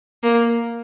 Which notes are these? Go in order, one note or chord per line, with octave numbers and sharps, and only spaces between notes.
A#3